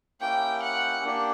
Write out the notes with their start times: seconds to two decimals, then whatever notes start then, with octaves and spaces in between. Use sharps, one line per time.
0.21 A#3 C#4 E4 G4 G5
0.62 F#5
1.04 A#3 D4 G4